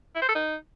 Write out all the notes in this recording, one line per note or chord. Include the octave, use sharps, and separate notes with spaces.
E4
C5
A4
D#4